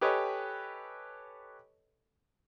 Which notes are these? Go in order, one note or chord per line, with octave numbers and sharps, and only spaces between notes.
G4 A4 B4 C#5 D#5 G#5